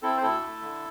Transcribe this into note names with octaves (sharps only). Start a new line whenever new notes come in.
C4 E4 A4
C5
D2 E4 A4
A3
D3